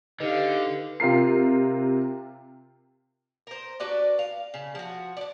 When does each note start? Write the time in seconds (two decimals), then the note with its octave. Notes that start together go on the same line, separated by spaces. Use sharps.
0.20 D3 D#4 G4 A4 B4 D#5 F5
1.00 C3 F4 A#4 C7
3.47 A#4 C5
3.80 D4 F#4 B4 D5
4.19 F5
4.54 C#3
4.75 F3 F#4
5.17 D4 D5